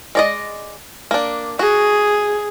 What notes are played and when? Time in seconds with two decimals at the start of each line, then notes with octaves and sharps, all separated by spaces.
0.15 G#3 D5 D#5
1.11 A#3 D4
1.59 F#4 G#4